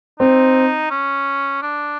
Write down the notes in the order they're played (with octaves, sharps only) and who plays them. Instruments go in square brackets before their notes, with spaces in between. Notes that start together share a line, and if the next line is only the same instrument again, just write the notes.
[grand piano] C4 [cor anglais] D#4
[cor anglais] C#4
D4